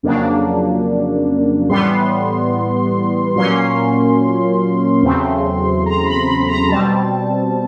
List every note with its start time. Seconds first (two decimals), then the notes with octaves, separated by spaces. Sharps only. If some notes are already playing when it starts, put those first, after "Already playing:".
0.03 F2 C#3 F#3 A#3 D4
1.69 A2 E3 G3 B3 C6
3.36 A#2 F#3 A#3 C#4 C6
5.02 E2 C#3 F#3 A3 C4
5.86 A#5
6.06 B5
6.27 B5
6.48 A#5
6.69 B2 G3 C4 A5